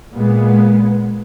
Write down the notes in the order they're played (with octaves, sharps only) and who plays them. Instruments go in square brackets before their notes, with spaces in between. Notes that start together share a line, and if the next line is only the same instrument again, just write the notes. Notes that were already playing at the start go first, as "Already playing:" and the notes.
[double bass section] A#2 G#3 B3